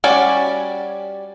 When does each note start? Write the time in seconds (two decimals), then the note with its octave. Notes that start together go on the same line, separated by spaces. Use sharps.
0.04 G3 C#4 F#4 D5 G#5